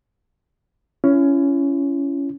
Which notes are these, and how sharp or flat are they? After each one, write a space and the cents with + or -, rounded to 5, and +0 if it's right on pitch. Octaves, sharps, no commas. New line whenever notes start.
C#4 +10 E4 +35